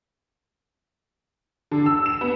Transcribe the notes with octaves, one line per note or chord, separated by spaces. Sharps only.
D3
E6
E7
B3